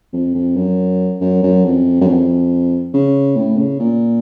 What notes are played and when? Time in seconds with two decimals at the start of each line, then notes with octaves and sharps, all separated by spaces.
0.13 F2
0.35 F2
0.56 F#2
1.21 F#2
1.43 F#2
1.65 F2
2.01 F#2
2.07 F2
2.94 C#3
3.36 A2
3.58 C#3
3.80 A#2